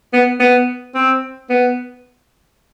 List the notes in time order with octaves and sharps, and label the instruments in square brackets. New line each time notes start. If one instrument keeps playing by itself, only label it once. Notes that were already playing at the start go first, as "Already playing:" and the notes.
[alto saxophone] B3
B3
C4
B3